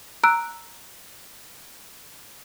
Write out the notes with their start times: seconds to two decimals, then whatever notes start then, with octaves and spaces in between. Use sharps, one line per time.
0.24 A#5 E6 F#6 D7